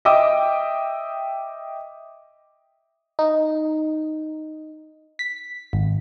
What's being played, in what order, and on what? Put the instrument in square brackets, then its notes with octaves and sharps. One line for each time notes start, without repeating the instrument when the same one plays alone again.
[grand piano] D#5 E5 G5 D6 D#6
[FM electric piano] D#4
B6
G#1